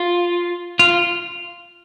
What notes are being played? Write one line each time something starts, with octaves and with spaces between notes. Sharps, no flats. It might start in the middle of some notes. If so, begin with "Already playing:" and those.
Already playing: F4
F4